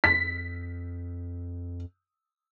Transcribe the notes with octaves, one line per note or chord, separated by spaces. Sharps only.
F2 B6